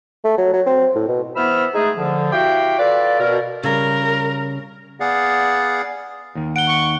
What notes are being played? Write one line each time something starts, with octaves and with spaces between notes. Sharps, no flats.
A3
F#3
F#3
C4
A2
B2
E3 B3 C5 B5 E6 F6
G#3 A3 D#4 G#4
D3 F3
E4 F#4 G4 F5 G5
F4 A4 B4 D5
B2 A#4
C#3 G3 A#4
B3 G#4 D5 F5 F#5
D#2 D#3
F#5 D7 G7
C#6